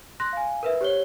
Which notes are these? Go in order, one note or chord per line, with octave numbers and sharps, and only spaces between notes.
C6 F#6 A#6
F5 G#5
A#4 B4 E5
G4 C5 C#5 G7